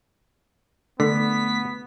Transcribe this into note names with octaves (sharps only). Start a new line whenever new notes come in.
D3 A3 B3 B6